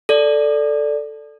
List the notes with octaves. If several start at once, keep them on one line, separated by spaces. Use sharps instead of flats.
A4 D5